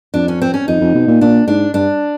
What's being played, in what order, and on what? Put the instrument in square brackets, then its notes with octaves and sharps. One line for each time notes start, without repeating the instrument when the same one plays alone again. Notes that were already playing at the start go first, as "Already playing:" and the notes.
[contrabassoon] F2 [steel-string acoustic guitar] D4
[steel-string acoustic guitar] C#4
C4
C#4
[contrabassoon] F2 [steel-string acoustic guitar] D#4
[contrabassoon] F2
B2
A#2
[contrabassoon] A#2 [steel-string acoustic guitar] D4
[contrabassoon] G#2 [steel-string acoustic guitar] D4
[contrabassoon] G2 [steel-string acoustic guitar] D4